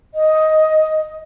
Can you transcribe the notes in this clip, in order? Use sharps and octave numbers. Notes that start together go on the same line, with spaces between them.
D#5